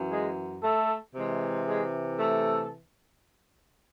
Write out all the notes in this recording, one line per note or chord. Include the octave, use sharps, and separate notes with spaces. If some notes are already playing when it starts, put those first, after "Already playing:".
Already playing: F#2 E3
G#3 G#4
A3 A4
C3 E3 G#3
G#3 G#4
A3 A4